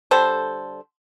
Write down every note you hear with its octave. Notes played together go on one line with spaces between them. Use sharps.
D3 G3 A4 C5